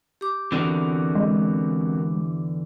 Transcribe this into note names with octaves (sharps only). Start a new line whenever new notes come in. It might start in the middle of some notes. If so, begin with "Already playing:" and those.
G4 D6
E2 D3 E3 C4 F#4 A#4
G#3